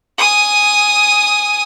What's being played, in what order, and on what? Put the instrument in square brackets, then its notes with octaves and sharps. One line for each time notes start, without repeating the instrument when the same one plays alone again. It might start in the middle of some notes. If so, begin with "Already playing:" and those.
[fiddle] G#5 D#6